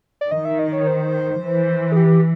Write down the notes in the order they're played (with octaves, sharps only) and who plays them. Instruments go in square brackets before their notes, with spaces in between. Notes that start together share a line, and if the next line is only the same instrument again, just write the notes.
[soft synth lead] D5
[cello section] D#3 [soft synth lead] D#5
[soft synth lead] E5
D#5
C#5
C5
[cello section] E3
[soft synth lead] G#4
G4